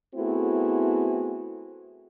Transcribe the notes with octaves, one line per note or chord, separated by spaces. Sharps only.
A3 B3 C4 E4 F#4 G#4